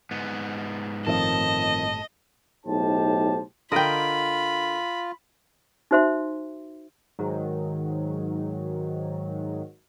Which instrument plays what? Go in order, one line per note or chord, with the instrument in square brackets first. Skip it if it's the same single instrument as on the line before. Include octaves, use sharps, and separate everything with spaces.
[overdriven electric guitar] G#2 B3
[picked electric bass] G1 A2 [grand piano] D#3 F3 C4 [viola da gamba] D#5 [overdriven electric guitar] A5
[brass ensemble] B1 A2 D#4 G4 C5 A5
[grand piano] D3 A#4 D7 [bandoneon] F4 [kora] D#5 G5 [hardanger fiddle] B5
[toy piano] D#4 F#4 C5 E5 C6
[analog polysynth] G#2 D#3 F#3